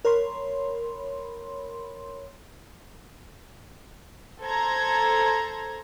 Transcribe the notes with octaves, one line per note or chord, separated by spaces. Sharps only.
A#4 C#5 B5 C6
A4 C5 A#5 G#6